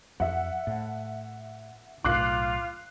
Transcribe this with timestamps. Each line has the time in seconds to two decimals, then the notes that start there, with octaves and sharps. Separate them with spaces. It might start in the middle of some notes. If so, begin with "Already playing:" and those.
0.20 F2 E5 F#5
0.67 A2
2.05 B1 A2 F4 D6 F#6 C7